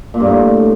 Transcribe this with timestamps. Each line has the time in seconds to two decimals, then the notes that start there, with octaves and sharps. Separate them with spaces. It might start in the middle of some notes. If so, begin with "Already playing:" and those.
0.14 A#2
0.20 G2
0.27 A2